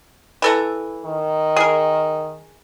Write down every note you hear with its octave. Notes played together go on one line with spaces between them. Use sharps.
E3 A4 A#5
D#3
G#4 A#4